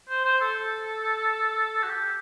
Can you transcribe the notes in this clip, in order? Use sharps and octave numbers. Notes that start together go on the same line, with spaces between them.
C5
C5
A4
F#4
G4